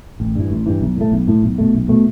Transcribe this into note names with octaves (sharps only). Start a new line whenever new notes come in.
A1
G2 E3
A1
G2 E3
B1
A2 A3
B1
A2 A3
B1
B2 A3
B1
B2 A3